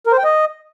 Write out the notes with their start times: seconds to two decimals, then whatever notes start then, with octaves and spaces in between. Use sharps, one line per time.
0.07 A#4
0.12 C5
0.18 G5
0.24 D#5